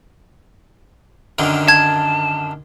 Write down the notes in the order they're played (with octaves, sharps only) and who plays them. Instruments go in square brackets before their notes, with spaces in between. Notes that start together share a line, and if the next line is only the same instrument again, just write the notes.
[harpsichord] F#2 D3 D#3
[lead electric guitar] A5 [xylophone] G#6